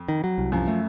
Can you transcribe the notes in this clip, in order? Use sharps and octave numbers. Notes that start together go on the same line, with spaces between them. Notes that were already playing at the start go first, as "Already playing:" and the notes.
Already playing: F2
D#3
F#3
C2
F#2 F3
A3